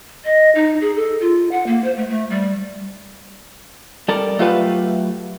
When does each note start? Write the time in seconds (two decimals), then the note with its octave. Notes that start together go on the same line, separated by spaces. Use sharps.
0.25 D#5
0.55 D#4
0.81 G#4
0.96 A4
1.21 F4
1.51 F#5
1.67 A#3
1.84 C5
1.96 A3
2.09 A3
2.30 G3
4.08 G3 A4 A#4 D5
4.39 F#3 A3 F4 G4 A4 B4